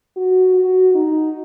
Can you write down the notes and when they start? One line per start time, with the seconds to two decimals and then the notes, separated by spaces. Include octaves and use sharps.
0.16 F#4
0.55 F#4
0.95 D#4